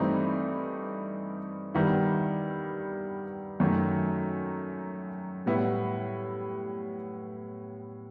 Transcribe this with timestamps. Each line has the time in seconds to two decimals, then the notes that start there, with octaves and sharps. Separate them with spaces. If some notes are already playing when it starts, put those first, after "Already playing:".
Already playing: G2 E3 A3 C4 D#4
1.74 G2 D#3 G3 B3 E4
3.60 F#2 D#3 F#3 A3
5.46 A2 G3 B3 E4